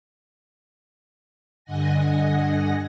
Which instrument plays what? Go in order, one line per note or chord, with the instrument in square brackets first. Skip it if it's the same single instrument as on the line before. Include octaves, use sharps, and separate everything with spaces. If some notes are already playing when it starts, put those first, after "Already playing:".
[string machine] G2 D3 D#5 F#5 G#5 A#6